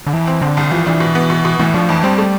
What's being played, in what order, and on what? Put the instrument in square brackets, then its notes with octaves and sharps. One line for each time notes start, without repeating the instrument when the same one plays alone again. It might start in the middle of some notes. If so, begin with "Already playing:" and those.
[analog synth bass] D3
[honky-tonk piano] F2 [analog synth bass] E3
[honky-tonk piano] C4
[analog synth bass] D3 [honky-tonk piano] C4
[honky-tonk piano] C2
[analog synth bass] E3 [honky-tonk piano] F3
[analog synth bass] E3 [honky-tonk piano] D4
[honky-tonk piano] B2
B3
B2
B2
[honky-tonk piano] A2 [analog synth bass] E3
[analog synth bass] F3 [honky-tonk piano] D4
[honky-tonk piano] F2 [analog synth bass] E3
[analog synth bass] G3 [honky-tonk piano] C4
[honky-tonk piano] A3